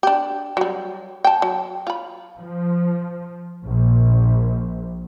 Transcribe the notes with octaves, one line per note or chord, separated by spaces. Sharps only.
D4 G4
F#3 G3
G5 A5
F#3
F4 B5
F3
A#1